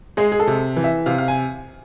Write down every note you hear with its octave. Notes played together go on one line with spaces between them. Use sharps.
G#3 G#4
G#4
A4
C3
E3
E5
C3 F5
F5
G#5